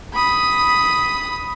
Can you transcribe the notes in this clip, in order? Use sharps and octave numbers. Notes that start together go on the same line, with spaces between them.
B5 D#6